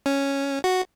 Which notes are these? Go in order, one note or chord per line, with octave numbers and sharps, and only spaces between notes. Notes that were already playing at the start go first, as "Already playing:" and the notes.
C#4
F#4